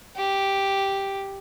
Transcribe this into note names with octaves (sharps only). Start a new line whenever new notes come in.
G4